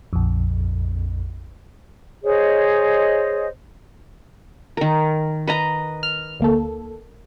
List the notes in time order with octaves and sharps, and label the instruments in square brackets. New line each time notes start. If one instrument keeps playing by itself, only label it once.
[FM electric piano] A#1 F2
[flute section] G#4 C5 C#5 D#5
[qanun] D#3 A#4
B4 D#5 A#5
[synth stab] F6
D2 A#3 A4